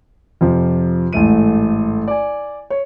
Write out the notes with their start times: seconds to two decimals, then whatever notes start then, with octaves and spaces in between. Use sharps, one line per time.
0.41 F2 C3 F3
1.13 A1 G#2 A3 D#7
2.08 D5 G#5
2.70 C#5